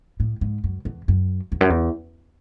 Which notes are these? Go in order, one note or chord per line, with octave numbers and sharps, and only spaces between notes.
A2
G#2
F#2
E2
F#2
E2
F#2
E2